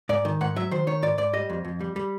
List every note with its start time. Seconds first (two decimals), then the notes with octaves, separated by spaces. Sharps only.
0.09 G#2 D5
0.25 D#3
0.41 G#2 F#5
0.56 F#3 E5
0.71 D#3 C5
0.87 D#3 C#5
1.02 G#2 D5
1.18 G#2 D5
1.33 G3 D#5
1.50 F2
1.65 F2
1.80 G3
1.96 G3